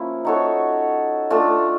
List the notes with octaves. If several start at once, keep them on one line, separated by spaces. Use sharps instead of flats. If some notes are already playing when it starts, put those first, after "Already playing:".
Already playing: F3 A#3 C#4 E4
D#4 F#4 A4 C#5
A3 D4 F4 A4